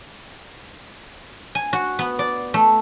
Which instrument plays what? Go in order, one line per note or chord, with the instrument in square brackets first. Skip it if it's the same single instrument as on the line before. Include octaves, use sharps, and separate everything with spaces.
[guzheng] G#5
F#4
B3
D5
A3